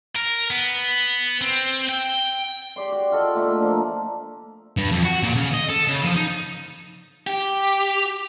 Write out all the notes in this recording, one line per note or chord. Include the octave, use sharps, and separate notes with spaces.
A#4
B3
C4
G5
G4 D5 C6
F#4
F4 A4 D#5 F#5
A#2 A3 D4
F3 A#3
G2
F2
F#4
A#2
C#3
D#5
A4
C#3
F3
D#4
G4